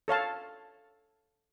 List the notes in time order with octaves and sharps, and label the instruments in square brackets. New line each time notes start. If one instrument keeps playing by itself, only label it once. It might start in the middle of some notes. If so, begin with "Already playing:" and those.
[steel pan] A4 C#5 F5 A5